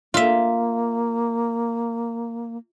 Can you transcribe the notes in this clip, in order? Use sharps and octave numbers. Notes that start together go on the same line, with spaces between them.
A#3 F4 E5